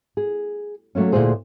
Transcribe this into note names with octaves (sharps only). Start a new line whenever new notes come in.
G#4
F#3 A3 A#3 C#4
D2 G2 A#2 E4 G#4 C5